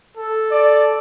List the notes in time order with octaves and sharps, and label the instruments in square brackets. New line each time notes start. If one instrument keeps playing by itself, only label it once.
[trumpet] A4
[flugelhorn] D5